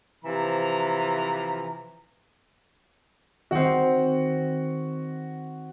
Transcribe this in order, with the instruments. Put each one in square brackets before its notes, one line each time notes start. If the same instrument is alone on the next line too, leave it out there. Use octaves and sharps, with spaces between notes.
[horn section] C3 E3 F3 A#5
[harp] D#3 C4 [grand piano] F#4 F#5